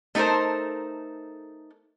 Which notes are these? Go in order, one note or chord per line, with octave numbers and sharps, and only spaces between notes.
A3 D#4 A4 A#4 C5